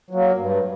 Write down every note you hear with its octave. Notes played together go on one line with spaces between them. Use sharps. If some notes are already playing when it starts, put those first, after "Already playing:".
F#3 A#3
G2